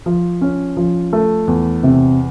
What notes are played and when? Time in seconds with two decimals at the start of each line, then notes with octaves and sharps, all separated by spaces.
0.06 F3
0.41 C#4
0.77 F3
1.13 A3
1.48 E2
1.83 C3